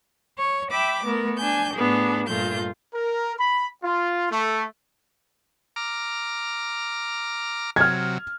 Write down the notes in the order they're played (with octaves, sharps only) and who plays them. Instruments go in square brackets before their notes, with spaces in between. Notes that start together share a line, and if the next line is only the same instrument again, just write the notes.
[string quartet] C#5
E5 G5 B5 D6
A3 B3 A#4
D4 G#5 G6
A2 B3 D4 G#4
G2 A#2 A3 F4 G6
[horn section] A#4
B5
F4
A3
[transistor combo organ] A#5 D6 F6
[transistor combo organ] C3 F#3 [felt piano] F6 G#6